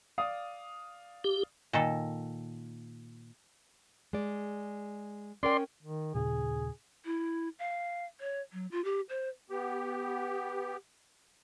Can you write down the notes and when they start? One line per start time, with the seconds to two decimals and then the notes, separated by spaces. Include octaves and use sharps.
0.18 D5 F5 D#6
1.24 G4
1.73 A#2 D#3 A4
4.13 G#3 D5
5.43 C#4 A#4 D5 G5 C6
5.83 D#3
6.15 D#2 A#2 C#3 G#4
7.05 E4
7.59 F5
8.20 C#5
8.53 F#3
8.71 F4
8.84 G4
9.09 C5
9.50 B3 G4